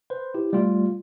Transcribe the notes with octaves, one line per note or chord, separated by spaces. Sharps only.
B4 C5
E4 G4
G3 A3 F4